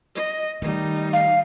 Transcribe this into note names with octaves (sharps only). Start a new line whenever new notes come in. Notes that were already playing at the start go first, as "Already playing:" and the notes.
D#5
D#3 G3 A3 D#4
F5